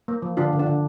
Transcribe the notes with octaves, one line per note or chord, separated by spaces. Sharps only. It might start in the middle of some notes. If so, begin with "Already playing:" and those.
A#3
F3
D3 D4 F4
D3
D4
D3